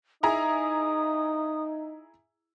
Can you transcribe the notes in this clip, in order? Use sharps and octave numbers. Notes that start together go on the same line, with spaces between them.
D#4 E4 G#4 A#5 D#6